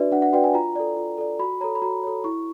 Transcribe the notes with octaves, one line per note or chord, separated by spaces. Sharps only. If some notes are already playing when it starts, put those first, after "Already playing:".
Already playing: D4 F#4 B4 D5 E5
D4 F#5
F#5
F#4 B4 D5 G5
G#5
F4 A#5
A4 D5
F4
A4 D5
F#4 B5
A4 C#5 A#5
B5
F#4 A#5
A4 C#5
E4 C#6